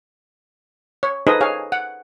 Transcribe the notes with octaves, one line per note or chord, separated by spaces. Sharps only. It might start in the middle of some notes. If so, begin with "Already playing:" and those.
C#5
D#4 G#4 A4 B4 C5 D#5
G#4 C#5 F5 G#5
F#5